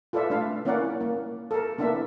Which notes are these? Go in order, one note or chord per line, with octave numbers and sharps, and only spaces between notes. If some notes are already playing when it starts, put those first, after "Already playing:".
F4 A4 B4 D5 E5
A3 D4 F5
A#3 C#4 E4 A#4 D5 F#5
A#3
A4 A#4
A#3 B3 D4 E4 E5